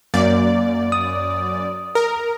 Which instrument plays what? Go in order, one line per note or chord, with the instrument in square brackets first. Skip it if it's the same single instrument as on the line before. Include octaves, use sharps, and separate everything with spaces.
[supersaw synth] F#2 D5 [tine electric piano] A#3
[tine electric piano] D#6
[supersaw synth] A#4